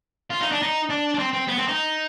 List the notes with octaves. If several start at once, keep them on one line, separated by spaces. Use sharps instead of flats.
F4
D#4
D4
D#4
D4
D4
C4
C4
B3
C4
D#4